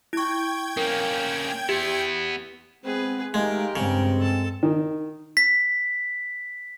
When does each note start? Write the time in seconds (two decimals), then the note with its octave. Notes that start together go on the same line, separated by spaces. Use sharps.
0.13 E4 G5 C#6 G#6
0.77 A#3 C#4 A#4
1.69 B3 E4 G4
2.84 G#3 B3 C4 G#4 B4
3.34 G#3 A3 D#4 G4 A#4 F5
3.76 G2 C#3 G#3 C4
4.17 A4 A5
4.63 D#3
5.37 B6